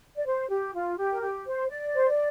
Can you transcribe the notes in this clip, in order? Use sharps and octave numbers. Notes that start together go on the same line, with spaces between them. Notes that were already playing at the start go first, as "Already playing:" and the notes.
D5
C5
G4
F4
G4
A#4
G4
C5
D5
C5
D5